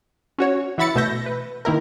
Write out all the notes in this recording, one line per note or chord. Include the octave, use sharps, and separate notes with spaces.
C#4 F#4 C#5
E3 F#4 E5 B5 A6 C#7
B2 A3 E5 G6 A#6
B4
D#3 A#3 E4 A#4